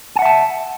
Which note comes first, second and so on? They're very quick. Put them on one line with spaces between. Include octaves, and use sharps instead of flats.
G#5 F#5 E5 A5